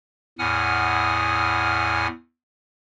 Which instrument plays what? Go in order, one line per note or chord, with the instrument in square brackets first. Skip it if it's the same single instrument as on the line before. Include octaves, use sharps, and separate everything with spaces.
[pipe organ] E2 A2 F#5 G#5 D#6 F6